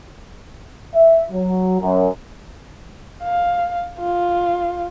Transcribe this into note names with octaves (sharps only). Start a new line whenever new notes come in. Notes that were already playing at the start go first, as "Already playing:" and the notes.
E5
F#3
F#2
F5
F4